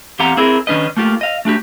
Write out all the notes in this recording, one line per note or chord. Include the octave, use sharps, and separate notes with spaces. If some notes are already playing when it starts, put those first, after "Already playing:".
E2 C4 G4 F5 F#5 A#5
C4 E4 G#4 A#4
D#3 C#4 D4 B4 D#5
A3 A#3 F4 G4
D#5 F5
A3 D4 F#4 G4